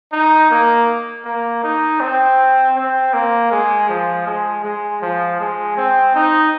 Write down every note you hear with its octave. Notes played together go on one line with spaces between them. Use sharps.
D#4
A#3
A#3
D#4
C4
C4
A#3
G#3
F3
G#3
G#3
F3
G#3
C4
D#4